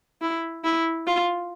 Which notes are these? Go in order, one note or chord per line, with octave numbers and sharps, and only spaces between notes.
E4
E4
F4